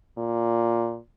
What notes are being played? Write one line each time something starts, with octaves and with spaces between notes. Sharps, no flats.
A#2